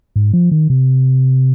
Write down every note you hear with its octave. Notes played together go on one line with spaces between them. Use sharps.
G#2
F3
D#3
C3